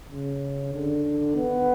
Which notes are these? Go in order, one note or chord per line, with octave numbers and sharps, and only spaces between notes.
C#3
D3
B3